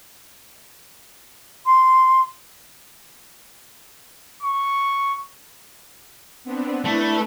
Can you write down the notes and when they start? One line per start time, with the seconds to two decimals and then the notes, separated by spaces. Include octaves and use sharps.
1.66 C6
4.43 C#6
6.44 B3 C4 D4
6.84 A3 D4 E4 B4